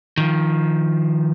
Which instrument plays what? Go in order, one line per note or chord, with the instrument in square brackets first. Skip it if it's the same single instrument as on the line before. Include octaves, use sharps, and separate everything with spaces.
[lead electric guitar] D#3 F3